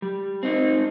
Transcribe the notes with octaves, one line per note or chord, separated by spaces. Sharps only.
G3
C4 D#4